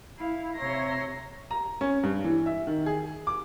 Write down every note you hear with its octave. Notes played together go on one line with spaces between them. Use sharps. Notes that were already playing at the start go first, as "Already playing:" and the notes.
E4 F5
C3 C#5 E5 A#5 C6 A#6
A#5
C#4
G2
E3
E5
D#3
G#4
D6